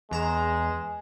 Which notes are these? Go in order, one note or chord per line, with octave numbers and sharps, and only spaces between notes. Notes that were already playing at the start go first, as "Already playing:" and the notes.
E2 G#3 A#5 E7